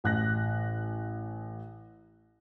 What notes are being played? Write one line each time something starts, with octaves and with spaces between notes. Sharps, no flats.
A1 F#6 A#6